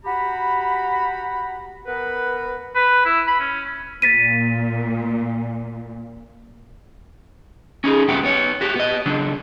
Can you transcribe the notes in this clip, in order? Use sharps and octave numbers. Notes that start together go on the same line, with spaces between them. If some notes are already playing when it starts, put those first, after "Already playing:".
F#4 G4 A#5 B5
B3 A#4 B4
B4
E4
B5
C#4
A#2 A6 B6 D#7
C#4 D#4 G#4
C2 F#2 F#3 B3 G4 F#5
B3 C#5
F#4 G4
B3 D#5
C#3 F#3 D4